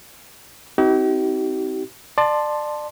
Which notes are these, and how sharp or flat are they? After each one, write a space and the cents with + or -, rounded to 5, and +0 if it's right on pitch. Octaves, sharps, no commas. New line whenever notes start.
C4 +0 D#4 +45 G4 -45
D5 +30 A5 +0 C6 +0